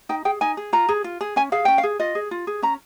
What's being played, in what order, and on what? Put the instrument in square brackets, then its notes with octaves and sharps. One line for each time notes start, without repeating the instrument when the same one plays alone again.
[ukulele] D#4 G5
G#4 G5
D#4 G#5
G#4
F4 A#5
G#4
F4
G#4
C#4 G#5
G#4 F5
C#4 G5
F5
G#4
F4 D#5
G#4
F4
G#4
C#4 A#5